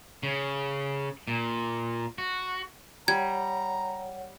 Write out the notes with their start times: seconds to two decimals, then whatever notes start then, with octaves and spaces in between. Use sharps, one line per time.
0.23 C#3
1.28 A#2
2.18 F#4
3.08 G3 C#5 F#5 A#5 G#6